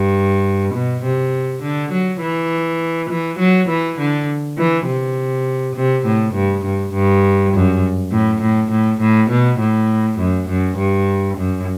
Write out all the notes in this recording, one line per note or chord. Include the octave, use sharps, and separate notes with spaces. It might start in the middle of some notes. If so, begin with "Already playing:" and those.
Already playing: G2
B2
C3
D3
F#3
E3
E3
F#3
E3
D3
E3
C3
C3
A2
G2
G2
G2
F#2
A2
A2
A2
A2
B2
A2
F#2
F#2
G2
F#2